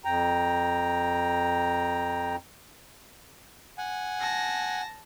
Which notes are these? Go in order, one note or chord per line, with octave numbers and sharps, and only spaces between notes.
F2 G5 A#5
F#5 G#5
A5 A#6